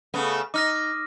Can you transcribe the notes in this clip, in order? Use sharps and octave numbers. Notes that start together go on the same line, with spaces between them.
C#3 A3 B3
D#4 D6 F6 A#6